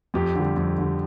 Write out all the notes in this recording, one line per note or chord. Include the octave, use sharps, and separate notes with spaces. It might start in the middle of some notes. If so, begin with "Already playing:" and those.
F2 G4
D3
G3
F2
D3 G3